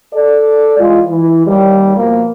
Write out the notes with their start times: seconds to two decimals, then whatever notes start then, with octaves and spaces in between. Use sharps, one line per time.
0.14 A4 D5
0.79 E3 G#3 F4
1.10 E3
1.45 D#2 G3
1.96 B2 F3 A#3